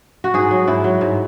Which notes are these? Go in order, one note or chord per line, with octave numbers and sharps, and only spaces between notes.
F#4
G#2 G#4
F#3
G#2 E4
F#3
G#2